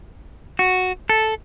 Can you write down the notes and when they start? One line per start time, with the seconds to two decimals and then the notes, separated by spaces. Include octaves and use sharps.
0.59 F#4
1.09 A4